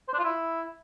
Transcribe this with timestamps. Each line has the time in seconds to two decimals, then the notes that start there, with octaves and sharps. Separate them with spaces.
0.08 C5
0.13 D4
0.19 F4
0.24 E4